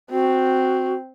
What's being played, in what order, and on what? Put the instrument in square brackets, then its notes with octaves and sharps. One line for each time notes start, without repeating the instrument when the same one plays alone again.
[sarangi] C4 [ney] F#4